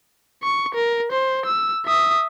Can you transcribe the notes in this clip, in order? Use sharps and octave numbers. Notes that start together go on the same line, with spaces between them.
C#6
A#4
C5
E6
E5 D#6